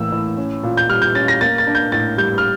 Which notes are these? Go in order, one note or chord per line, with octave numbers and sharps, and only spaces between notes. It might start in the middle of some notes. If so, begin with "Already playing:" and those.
Already playing: A2 E3 A#3 E6
A2
C#4
A#2
G6
G3 F6
G6
C#4 A6
A#6
A#3 A6
A6
D4
G6
A2 A6
G3 G6
F6